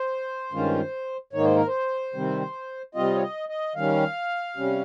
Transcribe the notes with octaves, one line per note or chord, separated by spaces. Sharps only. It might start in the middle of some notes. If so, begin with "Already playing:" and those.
Already playing: C5
G2 D#3 G#3 C#4 F4
G#2 D#3 A#3 D#4 C#5
C5
A#4
C5
C3 D#3 G3 C4
C3 G3 C4 F4 D#5
C#5
D#5
D#5
D#3 G3 C#4 F5
C3 G3 C#4